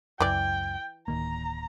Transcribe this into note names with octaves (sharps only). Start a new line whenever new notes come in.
C#2 F#2 E3 D5 G5
D1 D#3 A#3 A#5